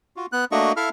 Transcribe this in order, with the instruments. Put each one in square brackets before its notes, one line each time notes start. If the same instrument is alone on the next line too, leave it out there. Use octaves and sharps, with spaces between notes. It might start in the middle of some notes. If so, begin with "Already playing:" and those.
[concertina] F4 F#4
B3 F#6
A3 A#3 D4 F#4 D#5 C#6
E4 A4 E5 F5 F6